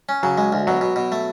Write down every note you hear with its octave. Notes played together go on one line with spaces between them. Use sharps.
C#4
C#3 F#3
G#3
D2
B2 F#3
B2
B2
A3